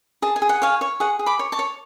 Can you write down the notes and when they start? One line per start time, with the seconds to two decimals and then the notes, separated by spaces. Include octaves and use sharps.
0.22 G#4 A5
0.36 G#5
0.42 G#4
0.49 F#5
0.62 C#5 F5 G#5
0.81 C#5
1.00 G#4 F#5
1.19 G#4
1.26 B5 D6
1.39 C#5
1.52 A5 C#6
1.59 C#5